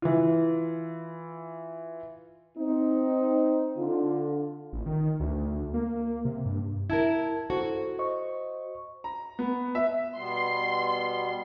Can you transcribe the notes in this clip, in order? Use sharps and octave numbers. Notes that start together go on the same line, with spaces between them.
E3 F4
C4 D#4
D3 F4
A1
D#3
D2
A#3
C3
G2
E4 A#4 A5 G#6
E4 F#4 A4 C5
C5 D#5 C#6
A#5
B3
E5
B2 G3 B3 C6